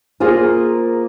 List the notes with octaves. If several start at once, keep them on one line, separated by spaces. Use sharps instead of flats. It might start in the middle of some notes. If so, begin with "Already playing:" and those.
A#3 F4 G#4 A#4 C5